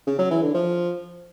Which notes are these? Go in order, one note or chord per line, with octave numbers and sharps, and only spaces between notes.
C#3
F#3
E3
D3
F3